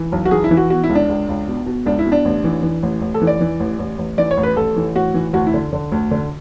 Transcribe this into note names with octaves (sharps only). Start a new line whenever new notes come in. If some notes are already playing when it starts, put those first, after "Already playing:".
Already playing: E3
B1
F#4
E3 G#4
E4
E3
F#4
B2 F#4
E4
C#2
D4
C#2
C#2
B2
B2
C#2 D4
E4
B2
D4
A1
E3
E3
A1
A1
A4
E3
D5
E3
A1
A1
A1
E3 D5
C#5
A1
B4
A1 A4
E3
A2 F#4
E3
D2 F#4
E4
D3
D3
D2
D3